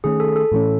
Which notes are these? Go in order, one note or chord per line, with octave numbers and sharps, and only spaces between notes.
D#3 A3 C#4 G#4
A4
A4
A2 E3 A3 C#4